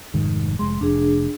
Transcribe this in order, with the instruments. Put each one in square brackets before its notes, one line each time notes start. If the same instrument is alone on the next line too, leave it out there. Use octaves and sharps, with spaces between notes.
[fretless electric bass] F1 G#2 D#3
[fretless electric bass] F1 G#3 [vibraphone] C6
[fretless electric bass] F1 [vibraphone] D4 G#4